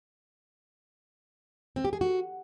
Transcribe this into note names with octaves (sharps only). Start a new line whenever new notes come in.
C4
G4
G#4
F#4